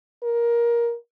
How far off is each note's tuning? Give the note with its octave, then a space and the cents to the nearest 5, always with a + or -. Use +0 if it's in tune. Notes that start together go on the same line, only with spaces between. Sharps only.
A#4 +15